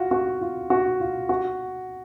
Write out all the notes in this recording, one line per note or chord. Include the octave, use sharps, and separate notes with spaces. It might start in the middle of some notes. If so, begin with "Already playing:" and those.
Already playing: F4 F#4
F#4
F4
F#4
F4
F#4